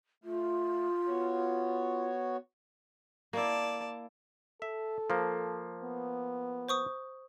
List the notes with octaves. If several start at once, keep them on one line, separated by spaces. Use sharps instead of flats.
A3 F4
B3 F#4 C#5
A#3 E4 D5 A5
A4 E5
F3 A#3
B3
C5 C#6 D#6